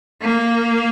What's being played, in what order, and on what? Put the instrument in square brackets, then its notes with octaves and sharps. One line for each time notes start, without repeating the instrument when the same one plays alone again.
[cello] A#3